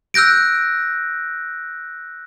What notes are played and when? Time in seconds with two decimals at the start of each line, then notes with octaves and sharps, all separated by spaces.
0.14 E6 F#6 G6 A#6 D7